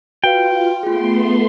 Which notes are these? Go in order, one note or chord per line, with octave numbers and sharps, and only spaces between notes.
F4 F#4 B4 F5 G5
A3 B3 F4 G#4 C6